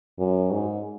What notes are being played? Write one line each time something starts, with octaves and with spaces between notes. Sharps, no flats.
F#2
G#2